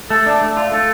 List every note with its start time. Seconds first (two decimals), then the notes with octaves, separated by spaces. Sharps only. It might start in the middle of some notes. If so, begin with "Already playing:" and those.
0.10 A3 A4
0.26 D4
0.41 A3
0.57 F4
0.72 A3 A4